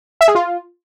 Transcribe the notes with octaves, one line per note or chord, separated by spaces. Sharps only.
E5
G#4
F4